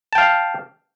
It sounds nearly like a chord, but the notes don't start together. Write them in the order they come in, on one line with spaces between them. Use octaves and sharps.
A5 G5 F5